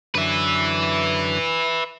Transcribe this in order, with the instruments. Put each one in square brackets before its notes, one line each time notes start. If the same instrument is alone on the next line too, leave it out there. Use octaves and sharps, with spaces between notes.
[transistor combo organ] F#2 D3 [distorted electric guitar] B4 E5